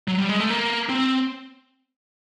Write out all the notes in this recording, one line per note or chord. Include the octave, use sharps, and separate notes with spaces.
F#3
G3
G#3
A3
A#3
C4